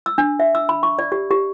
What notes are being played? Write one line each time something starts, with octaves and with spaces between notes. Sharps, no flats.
E6
D4
E5
E6
B5
C#6
D5
G4
G4